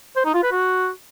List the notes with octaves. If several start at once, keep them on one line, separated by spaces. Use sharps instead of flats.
C5
D#4
F4
B4
F#4